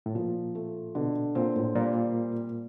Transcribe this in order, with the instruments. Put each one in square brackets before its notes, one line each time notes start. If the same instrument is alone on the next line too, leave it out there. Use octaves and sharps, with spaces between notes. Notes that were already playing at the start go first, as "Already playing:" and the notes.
[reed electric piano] A2
[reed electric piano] A#2 [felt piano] F3
[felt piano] A3
[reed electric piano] B2 [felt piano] D3
[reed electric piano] A#2 [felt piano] C4
[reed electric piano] A2
[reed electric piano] A#2 [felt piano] G3